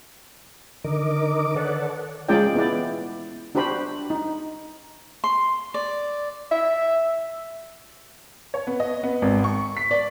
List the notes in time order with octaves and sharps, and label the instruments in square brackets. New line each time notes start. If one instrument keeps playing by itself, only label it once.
[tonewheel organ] D3 D#3 A#4 D#5 D6
A4 B4 C#5 D5 F#5 A5
[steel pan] G#3 C#4 F4 G#4 D5 G5
B3 E4 D5
D4 F#4 G4 C5 B5
D#4
[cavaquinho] C6
D5
[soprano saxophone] E5
[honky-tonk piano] C#5
B3
D#5
B3
G#1
C#6
B6
D5